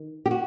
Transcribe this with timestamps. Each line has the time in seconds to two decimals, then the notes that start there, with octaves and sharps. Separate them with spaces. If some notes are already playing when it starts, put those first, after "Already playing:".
Already playing: D#3
0.26 G4
0.31 F#4